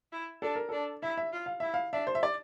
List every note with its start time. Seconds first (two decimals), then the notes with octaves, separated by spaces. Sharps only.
0.12 E4
0.42 D4 A4
0.55 A#4
0.69 D4 A4
1.02 E4 E5
1.17 E5
1.32 F4
1.46 F5
1.60 E4 E5
1.74 F5
1.93 D4 E5
2.07 C5
2.15 E5
2.23 D5